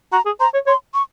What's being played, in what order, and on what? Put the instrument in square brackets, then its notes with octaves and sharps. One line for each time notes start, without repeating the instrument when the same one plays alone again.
[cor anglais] F#4 [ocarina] A#5
[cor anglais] G#4
[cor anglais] C5 [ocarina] A#5
[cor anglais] C#5
[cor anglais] C#5 [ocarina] C6
[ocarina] C#6